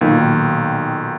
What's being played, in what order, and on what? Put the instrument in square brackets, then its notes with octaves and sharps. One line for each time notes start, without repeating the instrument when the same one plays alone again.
[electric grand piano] B1 A#2 D#3